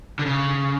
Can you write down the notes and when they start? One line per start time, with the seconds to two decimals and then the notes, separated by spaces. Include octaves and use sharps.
0.19 D3
0.26 C#3